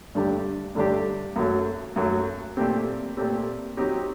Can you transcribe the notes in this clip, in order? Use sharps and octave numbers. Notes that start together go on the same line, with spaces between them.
G2 D3 A3 D4 G4
G2 D3 A3 D4 G4
F#2 F#3 A3
F#2 F#3 A3
A#2 A3 C4 G4
A#2 A3 C4 G4
F#3 C4 D#4 G4